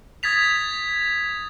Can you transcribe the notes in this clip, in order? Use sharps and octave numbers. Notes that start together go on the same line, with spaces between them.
D#6 G#6 A6 B6 F7